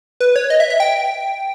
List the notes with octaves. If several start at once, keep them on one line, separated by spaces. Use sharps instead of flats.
B4
C#5
D#5
E5
E5
G5